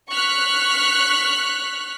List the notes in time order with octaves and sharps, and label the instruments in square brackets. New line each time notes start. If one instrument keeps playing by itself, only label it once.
[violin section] C#6 F6 F#6 B6